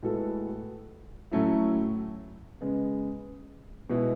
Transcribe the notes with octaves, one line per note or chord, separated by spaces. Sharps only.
A2 G#3 B3 F#4 A4
A2 F#3 A3 C#4 E4
C#3 G#3 B3
B2 G#3 B3 E4